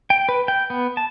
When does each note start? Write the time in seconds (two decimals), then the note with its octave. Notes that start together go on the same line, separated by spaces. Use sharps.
0.10 G5
0.29 B4
0.48 G5
0.70 B3
0.97 A5